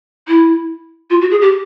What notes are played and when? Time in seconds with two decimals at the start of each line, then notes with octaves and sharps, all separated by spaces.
0.28 E4
1.10 F4
1.21 F#4
1.31 G#4
1.41 G4